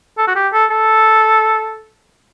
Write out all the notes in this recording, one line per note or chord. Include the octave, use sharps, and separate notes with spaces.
A4
F#4
G4
A4
A4